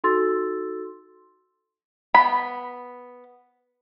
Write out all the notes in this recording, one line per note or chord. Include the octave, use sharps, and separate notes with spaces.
D#4 F#4 A4 C6 E6 A6
B3 B5